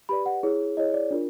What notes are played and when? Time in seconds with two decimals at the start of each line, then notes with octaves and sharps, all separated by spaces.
0.09 G4 B4 D5 B5
0.26 F#5
0.43 E4 G#4 C#5
0.77 E4 G#4 C#5 D#5
0.94 D5
1.11 D4 F4 A#4